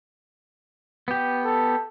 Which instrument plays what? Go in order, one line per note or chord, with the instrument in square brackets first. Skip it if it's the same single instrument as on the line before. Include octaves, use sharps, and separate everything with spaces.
[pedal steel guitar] B3 G4
[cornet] A4